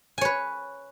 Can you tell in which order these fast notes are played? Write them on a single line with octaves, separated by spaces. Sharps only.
G#5 C#5 B4